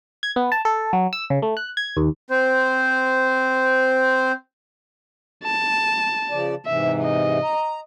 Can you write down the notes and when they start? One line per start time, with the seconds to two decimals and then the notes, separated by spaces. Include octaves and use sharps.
0.23 G#6
0.36 B3
0.52 A5
0.65 A4
0.93 F#3
1.13 E6
1.30 C#3
1.42 A3
1.57 F#6
1.77 G#6
1.97 D#2
2.31 C4 C5
5.44 A5
6.31 C#3 F3 D5
6.66 G#2 C3 E3 E5
7.03 D#5
7.43 A#5